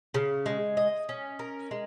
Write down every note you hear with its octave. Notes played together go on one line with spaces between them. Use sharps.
C#3
G#3
D#5
C#4
A#4
G#3